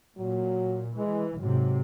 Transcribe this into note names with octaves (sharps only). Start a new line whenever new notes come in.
A#2 F#3
E3 G#3
G#2 C3 F#3